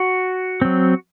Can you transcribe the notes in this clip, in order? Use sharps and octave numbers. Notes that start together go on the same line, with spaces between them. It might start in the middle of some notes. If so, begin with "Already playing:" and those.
Already playing: F#4
F#3 C4